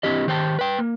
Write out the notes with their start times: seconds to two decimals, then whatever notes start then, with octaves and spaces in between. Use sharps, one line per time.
0.03 C4 D4 E4 G4 D#5
0.27 D#3 G4 C5 G5 A5
0.59 B4 G5
0.79 A#3